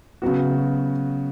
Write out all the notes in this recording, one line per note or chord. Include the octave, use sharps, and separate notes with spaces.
C#3 F#3 B3 F#4